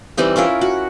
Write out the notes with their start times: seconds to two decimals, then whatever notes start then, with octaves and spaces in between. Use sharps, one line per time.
0.17 E3 G3 C4 D#4
0.36 C#4 E4 F4 A#4
0.61 F#4